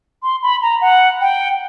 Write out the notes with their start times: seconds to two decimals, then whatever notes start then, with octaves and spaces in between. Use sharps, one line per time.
0.23 C6
0.42 B5
0.62 A#5
0.81 F#5
1.21 G5